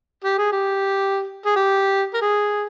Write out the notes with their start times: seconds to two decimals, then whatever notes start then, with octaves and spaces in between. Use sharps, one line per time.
0.24 G4
0.38 G#4
0.52 G4
1.46 G#4
1.56 G4
2.14 A#4
2.22 G#4